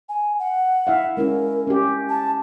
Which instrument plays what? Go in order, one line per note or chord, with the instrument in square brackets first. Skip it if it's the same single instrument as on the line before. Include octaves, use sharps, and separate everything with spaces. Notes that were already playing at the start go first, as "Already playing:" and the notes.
[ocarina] G#5
F#5
[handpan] E4 E5 F5
[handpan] G#3 C#4 E4 [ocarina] A#4
[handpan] C#4 G4
[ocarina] A5